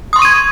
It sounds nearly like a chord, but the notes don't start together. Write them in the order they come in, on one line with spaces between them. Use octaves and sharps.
D#6 C6 C#6 D#7 G#6